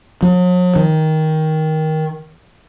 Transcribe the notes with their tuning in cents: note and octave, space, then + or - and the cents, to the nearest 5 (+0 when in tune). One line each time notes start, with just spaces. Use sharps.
F#3 -45
D#3 +15